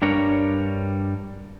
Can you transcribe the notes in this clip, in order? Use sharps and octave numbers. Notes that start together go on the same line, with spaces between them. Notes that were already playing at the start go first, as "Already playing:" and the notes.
G2 G3 D4 A#4 C#5